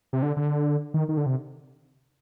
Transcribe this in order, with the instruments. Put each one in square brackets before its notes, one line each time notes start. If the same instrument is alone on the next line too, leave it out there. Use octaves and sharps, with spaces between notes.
[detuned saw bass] C3
D3
D3
D#3
D#3
D3
C3